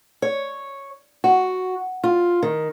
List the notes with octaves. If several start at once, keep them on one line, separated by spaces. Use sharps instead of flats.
C#5
F#4
F4
D#3